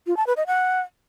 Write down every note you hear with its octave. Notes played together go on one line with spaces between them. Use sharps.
F4
A5
B4
D#5
F#5